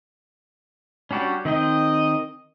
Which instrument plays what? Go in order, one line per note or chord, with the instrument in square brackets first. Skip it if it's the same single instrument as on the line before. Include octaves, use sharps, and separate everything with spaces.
[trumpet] G3 [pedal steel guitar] C#4 D4 F#4
[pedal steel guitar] D#3 C4 G5 [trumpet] D#5